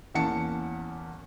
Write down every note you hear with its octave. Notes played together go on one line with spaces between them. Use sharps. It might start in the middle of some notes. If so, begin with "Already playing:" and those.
E2 A#3 C#4 F#5 A5 C#7